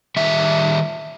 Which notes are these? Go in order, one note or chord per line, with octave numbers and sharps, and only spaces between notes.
D#3 G3 E5